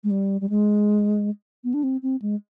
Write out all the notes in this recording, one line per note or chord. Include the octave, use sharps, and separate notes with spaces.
G#3
G3
G3
G#3
B3
D4
C4
C4
G#3